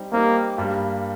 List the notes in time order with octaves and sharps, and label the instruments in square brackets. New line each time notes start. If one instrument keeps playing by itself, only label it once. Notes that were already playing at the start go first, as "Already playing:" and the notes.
Already playing: [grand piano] G3 C4 D#4 G4
[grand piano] G3 C4 D#4 G4 [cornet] A#3
[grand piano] G2 G3 A#3